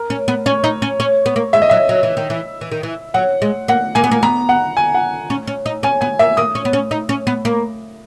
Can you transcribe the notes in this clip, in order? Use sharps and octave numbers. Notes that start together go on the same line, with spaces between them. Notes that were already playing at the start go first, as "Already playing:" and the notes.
Already playing: A#4
C#4
B3
C#4 C#5
D#4
C#4
C#4
B3
A#3
G#3 E5
D#5
F#3 E5
F#3
E3
D#3
E3
E3
D#3
E3
F#3 F#5
G#3
A#3 F#5
A#3 G#5
B3
A#3
B3 A#5
F#5
G#5
F#5
C#4
C#4
D#4
C#4 G#5
B3 G#5
A#3 E5
A#3 D#6
C#4
B3
C#4
D#4
C#4
B3
A#3